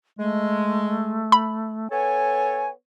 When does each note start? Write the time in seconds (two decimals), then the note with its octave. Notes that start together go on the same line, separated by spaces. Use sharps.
0.19 G#3 A3
1.32 B5
1.91 B3 A4 C#5 G#5